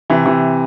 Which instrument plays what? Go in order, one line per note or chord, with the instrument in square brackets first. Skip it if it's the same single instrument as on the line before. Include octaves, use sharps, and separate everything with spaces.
[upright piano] C3 E3
C3 E3